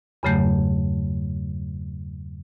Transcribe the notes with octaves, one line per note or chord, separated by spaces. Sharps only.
E2 G2 C#3 F#3 A3 G6